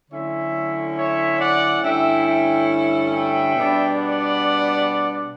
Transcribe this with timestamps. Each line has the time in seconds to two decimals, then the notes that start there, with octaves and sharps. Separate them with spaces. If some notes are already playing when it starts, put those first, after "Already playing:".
0.10 D3 F#3 A3 C#4 E4 C#5 E5
0.96 C#5 E5
1.39 D5 F#5
1.82 G2 D3 A3 C#4 E4 E5 G5
2.25 E5 G5
3.10 E5 G5
3.54 B2 G3 B3 D4
3.97 D5 F#5